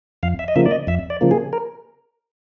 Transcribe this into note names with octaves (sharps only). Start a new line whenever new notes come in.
F2 F5
E5
D#5
C#3 F3 A#3 E5
D5
D#5
F2 E5
D5
C#3 F3 A#3
G#4
A#4